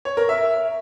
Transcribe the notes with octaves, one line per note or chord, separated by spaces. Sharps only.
C#5
A#4
E5